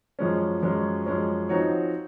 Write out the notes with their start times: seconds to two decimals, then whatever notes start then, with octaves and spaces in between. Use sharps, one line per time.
0.19 F#2 F3 G#3 C#4
0.63 F#2 F3 G#3 C#4
1.06 F#2 F3 G#3 C#4
1.49 F3 C4 D#4 F#4 C#5